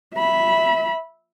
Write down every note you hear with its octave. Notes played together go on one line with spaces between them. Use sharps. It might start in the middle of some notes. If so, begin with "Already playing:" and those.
E5 B5